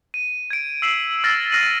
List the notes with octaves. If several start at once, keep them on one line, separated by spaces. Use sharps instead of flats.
D#7
G#6 D7
E6 B6 C7 E7 F#7
E6 F6 A6 A#6 C7
E6 F6 A#6 C7 D#7 F#7